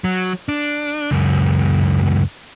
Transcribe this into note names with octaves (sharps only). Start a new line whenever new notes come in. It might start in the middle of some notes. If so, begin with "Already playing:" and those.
F#3
D4
C#2 F#2